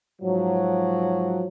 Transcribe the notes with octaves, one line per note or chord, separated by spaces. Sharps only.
G#2 F3 F#3